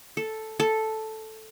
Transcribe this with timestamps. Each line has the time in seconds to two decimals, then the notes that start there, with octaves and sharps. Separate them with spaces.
0.17 A4
0.60 A4